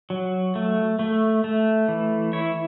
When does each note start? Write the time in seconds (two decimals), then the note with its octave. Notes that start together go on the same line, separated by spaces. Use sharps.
0.10 F#3
0.55 A3
0.99 A3
1.44 A3
1.88 E3
2.33 E4 C#5